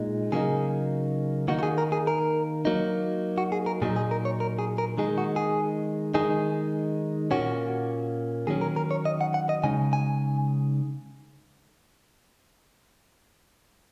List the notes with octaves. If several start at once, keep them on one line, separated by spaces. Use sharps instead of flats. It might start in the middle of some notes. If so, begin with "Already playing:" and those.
Already playing: A#2 G#3 D#4
C#3 F#3 A#3 D#4 G#4
D#3 A#3 D#4 F#4
F#4
G#4
A#4
G#4
A#4
F#3 A#3 D#4
F#4
G#4
A#4
A#2 F#3 D#4 G#4
G#4
A#4
C#5
A#4
G#4
A#4
D#3 G#3 D#4 G#4
F#4
G#4
D#3 G#3 D#4 G#4
A#2 A#3 C#4 F#4
D#3 F#3 C#4 G#4
A#4
A#4
C#5
D#5
F#5
F#5
D#5
C#3 G#3 D#4 G#5
G#5